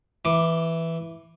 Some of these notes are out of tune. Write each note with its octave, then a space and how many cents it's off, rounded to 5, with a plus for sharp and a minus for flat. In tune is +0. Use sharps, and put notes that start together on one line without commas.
E3 +0 D6 +0